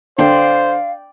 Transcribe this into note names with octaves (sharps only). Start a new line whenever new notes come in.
D3 C5 D5 F5 G5 C6